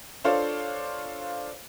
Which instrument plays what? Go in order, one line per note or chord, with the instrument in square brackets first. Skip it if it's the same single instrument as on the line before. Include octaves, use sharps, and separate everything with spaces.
[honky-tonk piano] D4 F4 A4 C5 C#5 F5